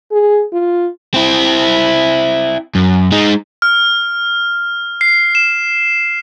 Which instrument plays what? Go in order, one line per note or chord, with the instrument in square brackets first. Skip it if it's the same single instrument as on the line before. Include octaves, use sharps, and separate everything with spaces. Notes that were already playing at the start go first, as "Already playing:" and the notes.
[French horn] G#4
F4
[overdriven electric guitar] C4 E4
F#2
G#3 D#4
[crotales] F6
C7
E7